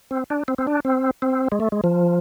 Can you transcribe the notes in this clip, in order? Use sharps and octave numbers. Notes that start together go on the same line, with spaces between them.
C4
D4
C4
C4
D4
C4
C4
G#3
A3
G#3
F3